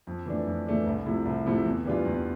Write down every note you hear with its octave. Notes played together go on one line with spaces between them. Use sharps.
F2
E3 A3 D4
F2
E3 A3 D4
C2
C3 F3 A3 E4
C2
C3 F3 A3 E4
E2
E3 G3 D4 F4
E2